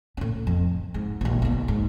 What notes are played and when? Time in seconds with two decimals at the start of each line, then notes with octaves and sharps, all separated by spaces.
0.17 A2 C#4
0.47 F2
0.94 G#2
1.21 A#1 D#2
1.42 B1 B2
1.68 G#2